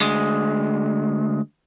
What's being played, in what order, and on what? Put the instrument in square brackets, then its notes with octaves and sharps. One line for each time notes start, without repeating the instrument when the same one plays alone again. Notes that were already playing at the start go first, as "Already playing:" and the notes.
[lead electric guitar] D2 G#3